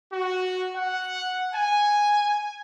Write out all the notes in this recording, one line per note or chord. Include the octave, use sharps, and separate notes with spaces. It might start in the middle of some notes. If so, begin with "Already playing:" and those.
F#4
F#5
G#5